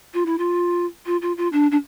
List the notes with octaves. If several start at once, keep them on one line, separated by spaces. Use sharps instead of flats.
F4
E4
F4
F4
F4
F4
D4
D4